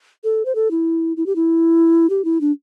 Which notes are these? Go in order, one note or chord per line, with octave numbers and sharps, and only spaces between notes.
A4
C5
A4
E4
E4
G4
E4
G4
E4
D4